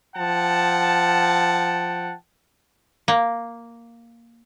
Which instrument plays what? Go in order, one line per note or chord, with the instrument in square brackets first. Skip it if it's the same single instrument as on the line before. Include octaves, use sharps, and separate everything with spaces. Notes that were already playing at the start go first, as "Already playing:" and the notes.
[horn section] F3 F#5 G5 A5
[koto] A#3